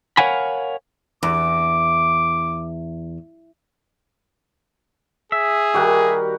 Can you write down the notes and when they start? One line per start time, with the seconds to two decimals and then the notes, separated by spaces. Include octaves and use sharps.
0.17 A#4 C#5 F5 F#5 G#5 B5
1.23 E2 D6
5.32 G#4 E5
5.74 D#3 G3 F#4 G4 A#4 F#5